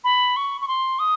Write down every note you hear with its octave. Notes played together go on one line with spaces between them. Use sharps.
B5
C#6
C#6
C6
D#6